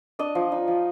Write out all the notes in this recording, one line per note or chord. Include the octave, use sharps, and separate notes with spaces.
D4 D#5
F3
D#4
F3